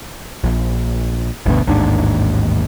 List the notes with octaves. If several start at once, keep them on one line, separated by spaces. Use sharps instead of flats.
A#1
G1 D2 B2
A1 D#2 G#2 D4